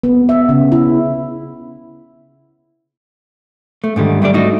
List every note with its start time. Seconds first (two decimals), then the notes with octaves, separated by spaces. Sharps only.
0.03 B3
0.29 E5
0.49 C#3
0.72 E4
3.84 A3
3.96 G#2 D3 D#3 G3
4.22 G3 A3 D4 D5
4.34 A3 D#4 F#4